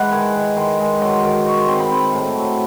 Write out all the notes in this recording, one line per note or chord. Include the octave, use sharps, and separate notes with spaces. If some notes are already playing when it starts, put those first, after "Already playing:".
Already playing: E3 G#3 F#5
D#3 G#5
D#3
D#3 C6
G#3
F#3 C6
D#3
D#4 C#6
C6
C4 C6
B5
C4
A2
F#3